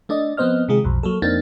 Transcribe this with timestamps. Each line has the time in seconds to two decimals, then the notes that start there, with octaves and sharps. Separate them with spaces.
0.09 A3 D4 D5 D#5
0.37 F3 B3 C4 C5 D#5 F6
0.68 C3 D#3 G#3 F4 G#4
0.84 B1 F2
1.03 F#3 A#3 A4
1.22 F2 A#3 C4 D4 D#4 A6